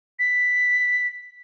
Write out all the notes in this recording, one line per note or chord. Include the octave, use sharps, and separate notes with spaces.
B6